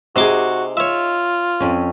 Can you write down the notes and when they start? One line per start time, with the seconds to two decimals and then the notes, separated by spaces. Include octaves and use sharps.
0.16 C3 D#4 F#4 G#4 C6 D6
0.77 F4 C#5 E5
1.60 F2 C#4